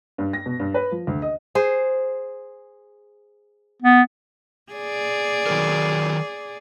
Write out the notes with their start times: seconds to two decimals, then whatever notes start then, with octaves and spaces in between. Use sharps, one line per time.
0.18 G2
0.33 A#6
0.46 B2
0.60 G2
0.74 B4
0.91 F3
1.07 D2
1.22 D#5
1.55 G#4 C5
3.82 B3
4.72 G#4 D5
5.47 D#3 F#3 A#4